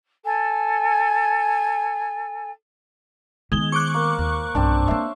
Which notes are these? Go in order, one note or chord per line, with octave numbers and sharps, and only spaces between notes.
A4 G#5
D#3 G#3 B3 G7
C5 C#6 D6 F#6
A#3
D#2
B1 G2 C4 D4
A3 A#3 C#5 E5 C6